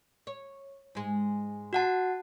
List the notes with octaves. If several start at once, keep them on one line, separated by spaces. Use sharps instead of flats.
C#5
G#2 G#3
F#4 F#5 A5